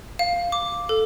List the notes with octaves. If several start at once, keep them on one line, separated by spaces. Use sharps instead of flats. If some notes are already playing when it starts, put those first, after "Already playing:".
F5
D6
A4